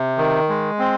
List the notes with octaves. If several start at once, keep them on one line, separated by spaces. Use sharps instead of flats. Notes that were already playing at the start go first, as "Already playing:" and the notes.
Already playing: C3
D#3
G#3
C4